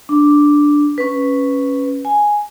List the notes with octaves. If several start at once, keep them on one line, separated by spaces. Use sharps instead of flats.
D4
C#4 B4
G#5